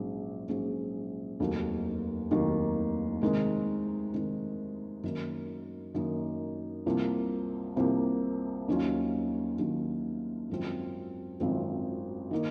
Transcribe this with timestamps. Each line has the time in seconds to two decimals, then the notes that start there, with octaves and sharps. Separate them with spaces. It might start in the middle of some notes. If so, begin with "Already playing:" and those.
Already playing: A#1 G#2 F#3 C#4 G#4
0.49 A#1 G#2 F#3 C#4 G#4
1.40 F1 D#2 D#3 F#3 A#3
2.31 F1 D#2 D#3 F#3 A#3
3.22 C3 D#3 G#3 D#4 A#4
4.13 C3 D#3 G#3 D#4 A#4
5.04 F#2 D#3 A#3 D#4
5.95 F#2 D#3 A#3 D#4
6.86 C2 C3 F3 A#3
7.76 C2 C3 F3 A#3
8.68 D#2 D#3 F#3 C#4 F4
9.59 D#2 D#3 F#3 C#4 F4
10.50 G#1 F#2 F3 C4
11.40 G#1 F#2 F3 C4
12.31 D#3 A#3 D#4